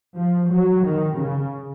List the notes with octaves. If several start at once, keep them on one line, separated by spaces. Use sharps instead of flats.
F3
F#3
D#3
C#3